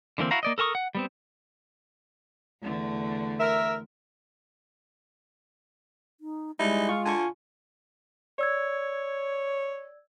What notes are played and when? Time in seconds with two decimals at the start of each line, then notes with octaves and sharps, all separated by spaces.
0.18 D3 E3 A#3 C4
0.31 E4 F#4 F5 A#5
0.43 A#3 D5 D#5
0.58 A4 A#4 A5 C#6 D#6
0.75 F#5
0.95 G3 B3 C4
2.62 E2 D3 A3
3.39 A#4 E5
6.20 D#4
6.59 G3 G#3 D#4 E4
6.89 F4 C#6
7.05 D3 G#5 C#6
8.39 C#5 D5 E6 G#6